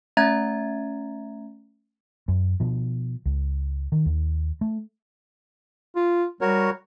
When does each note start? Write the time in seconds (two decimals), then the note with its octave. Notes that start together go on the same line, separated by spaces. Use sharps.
0.17 A3 C#4 E5 A#5 G#6 A6
2.28 F#2
2.60 B2 F3
3.26 C#2
3.92 D#3
4.06 D#2
4.61 A3
5.96 F4
6.41 G3 F#4 A#4 C#5